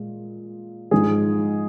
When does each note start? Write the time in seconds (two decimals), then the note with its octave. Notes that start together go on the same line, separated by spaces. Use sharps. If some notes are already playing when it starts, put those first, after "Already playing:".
Already playing: A#2 G#3
0.91 G#2 F3 G#3 G#4